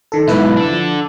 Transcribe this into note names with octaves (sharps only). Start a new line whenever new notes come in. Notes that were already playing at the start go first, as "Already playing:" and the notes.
D#3 A4
B1 G#2 E4 B4 E5
D4 A4
F3